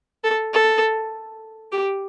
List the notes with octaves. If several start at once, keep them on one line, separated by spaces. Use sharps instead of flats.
A4
A4
G4